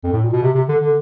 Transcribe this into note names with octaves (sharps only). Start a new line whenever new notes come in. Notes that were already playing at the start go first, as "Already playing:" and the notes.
F2
A2
A#2
B2
C3
C3
D3
D3